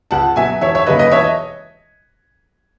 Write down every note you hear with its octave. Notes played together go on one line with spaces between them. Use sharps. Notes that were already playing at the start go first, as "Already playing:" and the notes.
C#2 F#5 A5
B2 F#3 E5 G#5
E1 C#5 E5
C#5 E5
D#2 C#3 F#3 B4 D#5
B4 D#5
E1 C#5 E5
D#5